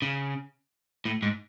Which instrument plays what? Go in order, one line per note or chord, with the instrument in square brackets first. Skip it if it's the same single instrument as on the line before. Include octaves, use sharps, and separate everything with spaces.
[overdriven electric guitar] C#3
A2
G#2